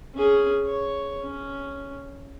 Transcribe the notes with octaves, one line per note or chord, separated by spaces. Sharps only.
C#4 G#4
C#5
C#4